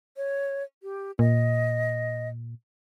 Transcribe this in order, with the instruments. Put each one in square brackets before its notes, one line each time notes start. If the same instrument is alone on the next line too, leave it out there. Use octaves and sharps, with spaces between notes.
[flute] C#5
G4
[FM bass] A#2 [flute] D#5